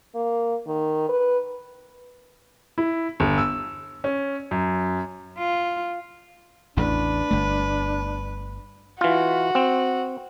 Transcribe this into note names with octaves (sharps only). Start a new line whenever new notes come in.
A#3
D#3
B4
E4
G1
E6
C#4
F#2
F4
A1 E2 D4 B4
G1 A3
E3 F4 F#4
C4